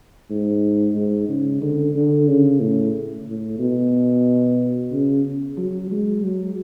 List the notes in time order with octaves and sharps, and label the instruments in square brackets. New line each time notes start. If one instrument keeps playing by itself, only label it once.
[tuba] G#2
G#2
C#3
D3
D3
C#3
A2
A2
B2
C#3
F#3
G#3
F#3